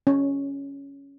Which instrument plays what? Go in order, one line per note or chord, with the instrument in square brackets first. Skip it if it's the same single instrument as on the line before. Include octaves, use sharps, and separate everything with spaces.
[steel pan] C#4